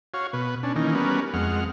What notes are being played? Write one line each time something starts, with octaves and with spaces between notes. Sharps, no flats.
F#4 C#5 F5
B2 B4
C#4 D4
D#3 E3 A#3 C#4 D#4
G3 B3 C#4 F#4 A#4 B4
F2 G#3 F#5 F6